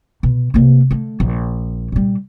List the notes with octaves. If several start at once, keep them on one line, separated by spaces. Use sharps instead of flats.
B2
C3 A#3
D3 A3
A#1
A#2 G3